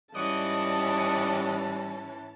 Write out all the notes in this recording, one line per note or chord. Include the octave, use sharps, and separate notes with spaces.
G#2 E3 G3 C#4 F#4 D5 D#5 A5